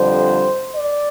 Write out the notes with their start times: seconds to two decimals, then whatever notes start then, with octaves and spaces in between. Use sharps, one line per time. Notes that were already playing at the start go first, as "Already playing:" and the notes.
Already playing: F2 D3 G3 C5
0.74 D5